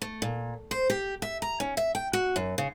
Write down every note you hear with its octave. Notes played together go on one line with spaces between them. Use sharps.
A3
A#2
C5
G4
E5
A#5
C#4
E5
G5
F#4
F#2
C#3